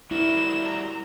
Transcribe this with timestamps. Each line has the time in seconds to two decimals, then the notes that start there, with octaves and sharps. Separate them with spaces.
0.11 G3 E4 F#4 A#4 E7
0.68 A#5